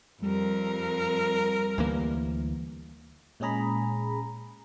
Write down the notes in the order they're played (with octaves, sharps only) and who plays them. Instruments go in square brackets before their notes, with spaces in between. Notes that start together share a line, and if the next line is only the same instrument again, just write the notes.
[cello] F2 A#4 [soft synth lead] G3
[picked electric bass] D2 E3 A#3
[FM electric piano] A#2 G#3 C#4 G#4 A#5 B5